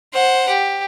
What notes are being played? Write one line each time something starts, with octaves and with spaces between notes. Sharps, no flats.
C5 F#5
G4